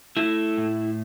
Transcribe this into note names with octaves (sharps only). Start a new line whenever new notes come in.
A3 E4
A2